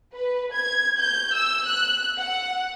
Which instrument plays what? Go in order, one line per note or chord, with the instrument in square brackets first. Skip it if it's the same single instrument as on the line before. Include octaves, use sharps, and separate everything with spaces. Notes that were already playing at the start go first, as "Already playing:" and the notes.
[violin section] B4
G#6
G6
E6
F#6
F#5